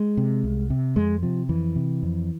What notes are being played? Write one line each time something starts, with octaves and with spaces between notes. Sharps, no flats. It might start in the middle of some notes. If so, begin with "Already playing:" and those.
Already playing: G#3
C3
C2
C3
F2 G#3
C3 F3
F2 E3
C3
F2